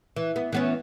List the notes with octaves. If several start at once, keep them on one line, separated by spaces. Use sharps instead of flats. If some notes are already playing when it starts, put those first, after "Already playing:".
E3
B3
E3 B3 C#4